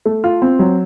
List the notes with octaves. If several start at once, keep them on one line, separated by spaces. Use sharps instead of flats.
A3
F4
C4
F#3